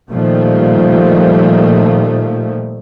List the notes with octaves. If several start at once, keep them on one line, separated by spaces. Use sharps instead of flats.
A#2 D#3 F3 G3 A3